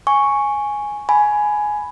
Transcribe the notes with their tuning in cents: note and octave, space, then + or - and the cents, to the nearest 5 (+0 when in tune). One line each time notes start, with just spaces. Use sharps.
G#5 +0 C#6 +0
G#5 +10 B5 +0